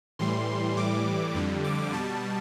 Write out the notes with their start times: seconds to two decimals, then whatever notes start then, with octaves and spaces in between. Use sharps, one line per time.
0.19 A2 E3 G3 C6
0.77 A2 E3 G3 D6
1.35 F2 D3 G3
1.64 D6
1.93 B2 G3 A5